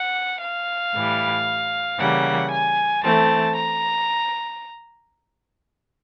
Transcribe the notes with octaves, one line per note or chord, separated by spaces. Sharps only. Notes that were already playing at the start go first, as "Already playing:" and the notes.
Already playing: F#5
F5
A2 E3 G3
C#3 E3 G3 A#3 F#5
G#5
E3 A3 C4 A5
A#5